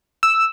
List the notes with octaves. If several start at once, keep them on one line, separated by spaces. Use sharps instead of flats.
E6